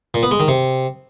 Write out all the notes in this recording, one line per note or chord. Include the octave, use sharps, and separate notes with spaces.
A#2
B3
G#3
D#3
C3